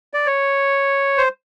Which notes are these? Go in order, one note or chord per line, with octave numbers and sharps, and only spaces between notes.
D5
C#5
C5